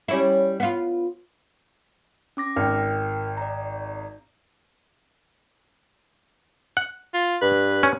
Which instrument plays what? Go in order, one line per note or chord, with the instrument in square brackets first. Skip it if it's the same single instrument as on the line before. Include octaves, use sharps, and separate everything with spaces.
[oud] G3 C#4 E4
B3 F4
[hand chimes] C#4 D6 A#6
[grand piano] G#1 [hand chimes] A#4 G5 F6
[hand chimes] D5 A#5
[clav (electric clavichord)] F#5
[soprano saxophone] F4
[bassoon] G2 [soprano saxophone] B4
[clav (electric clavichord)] C#4